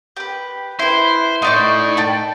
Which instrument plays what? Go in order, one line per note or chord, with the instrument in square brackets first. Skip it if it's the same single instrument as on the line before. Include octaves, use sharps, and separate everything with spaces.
[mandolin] G4 B4
[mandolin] E4 B4 [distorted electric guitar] C5
[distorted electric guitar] A2 [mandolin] D#4 D5 C#6
[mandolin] D5 G5 A5